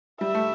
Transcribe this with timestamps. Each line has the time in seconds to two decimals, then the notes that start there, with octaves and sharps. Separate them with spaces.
0.21 G3 E5
0.34 A3